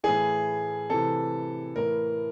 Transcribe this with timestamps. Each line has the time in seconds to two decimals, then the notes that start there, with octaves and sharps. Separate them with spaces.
0.04 A2 E3 G#4
0.90 C3 E3 A4
1.76 A2 E3 A#4